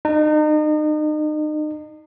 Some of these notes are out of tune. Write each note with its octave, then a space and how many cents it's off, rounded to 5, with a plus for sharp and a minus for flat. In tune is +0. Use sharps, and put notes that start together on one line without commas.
D#4 -35